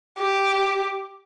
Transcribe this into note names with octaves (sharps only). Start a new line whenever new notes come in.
G4